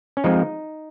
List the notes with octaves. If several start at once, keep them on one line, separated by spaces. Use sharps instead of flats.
C#4
F3 G#3 C4 D#4